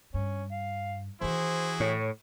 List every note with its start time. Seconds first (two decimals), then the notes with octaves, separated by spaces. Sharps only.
0.14 G2 C#4
0.51 F5
1.21 D#3 E3 E4 F#4 G#4 C5
1.80 A2 C#5